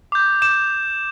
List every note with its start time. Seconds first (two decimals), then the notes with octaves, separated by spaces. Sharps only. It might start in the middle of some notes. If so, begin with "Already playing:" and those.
0.12 D6 G6
0.42 D6 G6 E7